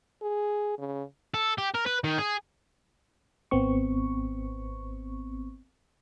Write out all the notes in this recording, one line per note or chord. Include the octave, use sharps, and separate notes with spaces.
G#4
C#3
A4
G4
A#4
B4
D#3
G#4
G#1 B3 C4 C#6